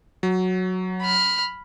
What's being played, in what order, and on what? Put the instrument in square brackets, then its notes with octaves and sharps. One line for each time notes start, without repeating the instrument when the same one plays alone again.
[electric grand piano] F#3
[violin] B5 F6